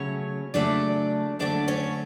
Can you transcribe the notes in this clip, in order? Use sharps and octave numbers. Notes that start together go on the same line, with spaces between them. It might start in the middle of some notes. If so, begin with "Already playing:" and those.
Already playing: C#3 F#3 A3 C#4 C#5
C#3 F#3 A3 D4 D5
D3 F#3 A3 D4 D5
C#4 C#5